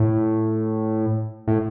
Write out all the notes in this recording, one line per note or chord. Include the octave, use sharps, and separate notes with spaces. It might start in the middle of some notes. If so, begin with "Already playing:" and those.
Already playing: A2
A2